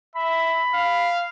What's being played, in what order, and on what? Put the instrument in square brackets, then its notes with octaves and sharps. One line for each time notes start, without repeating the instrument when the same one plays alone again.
[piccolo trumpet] E5 [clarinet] B5
[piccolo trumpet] F5